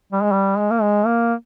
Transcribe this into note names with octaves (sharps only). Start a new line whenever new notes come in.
G3
G#3
G3
G#3
A#3
G#3
A#3